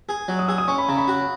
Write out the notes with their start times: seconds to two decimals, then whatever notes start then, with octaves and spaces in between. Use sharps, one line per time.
0.09 G#4
0.28 F#3
0.39 D#6
0.48 G#4 E6
0.58 D#6
0.68 C#4 C#6
0.78 B5
0.88 C#3 A#5
0.98 B5
1.08 F#4